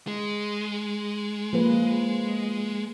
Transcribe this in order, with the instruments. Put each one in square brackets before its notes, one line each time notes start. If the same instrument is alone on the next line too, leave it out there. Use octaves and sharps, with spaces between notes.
[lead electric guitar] G#3
[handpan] F3 A#3 B4